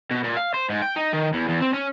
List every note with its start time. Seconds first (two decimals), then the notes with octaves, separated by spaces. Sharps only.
0.11 B2
0.24 A#2
0.37 F5
0.54 C5
0.70 G#2
0.82 G5
0.96 D#4
1.13 D#3
1.33 E2
1.48 E2
1.61 C4
1.73 C#4